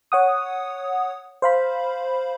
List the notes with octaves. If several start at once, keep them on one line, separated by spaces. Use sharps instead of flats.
C#5 F#5 D#6
C5 F5 B5